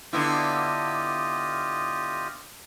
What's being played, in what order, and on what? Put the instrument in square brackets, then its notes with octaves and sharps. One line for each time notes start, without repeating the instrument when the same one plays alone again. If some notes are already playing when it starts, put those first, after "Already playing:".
[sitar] D3 B3 E4 [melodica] F4 G4 D#5